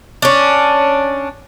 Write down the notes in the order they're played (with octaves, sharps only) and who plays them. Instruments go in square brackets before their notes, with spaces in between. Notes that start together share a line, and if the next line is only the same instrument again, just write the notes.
[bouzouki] C#4 D4